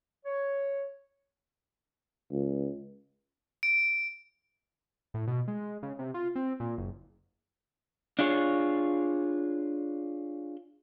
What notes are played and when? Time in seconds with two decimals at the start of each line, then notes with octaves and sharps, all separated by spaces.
0.25 C#5
2.31 C#2
3.63 D7
5.14 A2
5.27 B2
5.48 G#3
5.83 C#3
5.99 C3
6.14 F4
6.35 C4
6.60 A#2
6.78 F#1
8.19 D4 F4 G#4 C#5